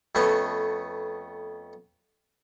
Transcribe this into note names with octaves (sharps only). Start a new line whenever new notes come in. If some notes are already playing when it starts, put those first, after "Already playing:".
F2 A3 B3 C#4